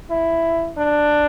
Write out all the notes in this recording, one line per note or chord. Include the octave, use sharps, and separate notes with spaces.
E4
D4